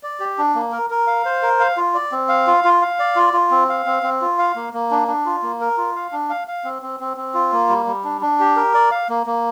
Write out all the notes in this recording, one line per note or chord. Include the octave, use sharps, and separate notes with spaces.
D5
G4
D4
A#3
A#4
A#4
F5
C5
A#4
F5
F4
D5
C4
F5
F4
F4
F5
D5
F4
F4
C4
F5
C4
C4
F4
F5
A#3
A#3
D4
D4
F4
A#3
A#4
F4
F5
D4
F5
F5
C4
C4
C4
C4
F4
A#3
G3
G3
D4
D4
G4
A#4
D5
F5
A#3
A#3